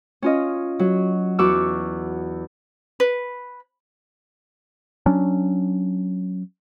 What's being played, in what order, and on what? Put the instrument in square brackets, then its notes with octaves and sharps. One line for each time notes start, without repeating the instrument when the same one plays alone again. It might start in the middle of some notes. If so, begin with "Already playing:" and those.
[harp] C#4 F4 D#5
F#3
E2 F#4 C#6 D6 E6
[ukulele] B4
[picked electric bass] F#3 C#4 D4